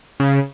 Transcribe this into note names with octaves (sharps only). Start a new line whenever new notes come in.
C#3